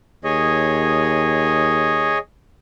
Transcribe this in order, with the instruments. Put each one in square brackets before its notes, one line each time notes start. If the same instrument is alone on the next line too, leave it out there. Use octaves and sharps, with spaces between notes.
[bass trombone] D#2 [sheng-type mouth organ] G#4 C#5 D#5